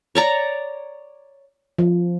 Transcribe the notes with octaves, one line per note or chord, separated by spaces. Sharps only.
C#5 D5 A#5
F3